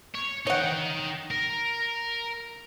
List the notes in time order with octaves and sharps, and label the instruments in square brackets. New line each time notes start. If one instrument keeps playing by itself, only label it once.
[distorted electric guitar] C#5
[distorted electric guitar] D#4 G5 [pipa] C#5 F#5
[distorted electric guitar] A#4